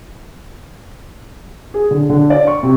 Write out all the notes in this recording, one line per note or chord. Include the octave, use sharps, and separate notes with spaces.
G#4
D3
D3
D5
C#6
C3